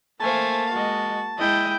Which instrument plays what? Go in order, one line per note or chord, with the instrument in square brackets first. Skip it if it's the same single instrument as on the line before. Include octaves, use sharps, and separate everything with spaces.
[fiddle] A3 F5 [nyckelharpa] A#3 [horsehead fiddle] C5 G#5 [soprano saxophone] A5
[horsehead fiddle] G#3 D#5 [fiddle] F#4
[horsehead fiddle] G#3 [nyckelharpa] E4 G5 [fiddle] D#5